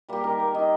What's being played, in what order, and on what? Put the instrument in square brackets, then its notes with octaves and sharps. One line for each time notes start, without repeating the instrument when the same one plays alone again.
[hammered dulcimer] G3 A#3 G4
D#3 A#4
A#3
D#3 D#5